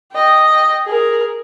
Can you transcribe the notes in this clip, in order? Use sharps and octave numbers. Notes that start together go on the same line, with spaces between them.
D#5 G5
G#4 A#4